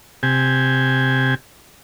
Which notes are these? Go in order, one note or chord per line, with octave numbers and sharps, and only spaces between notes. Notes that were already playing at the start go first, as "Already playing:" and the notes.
C3 G4 G#5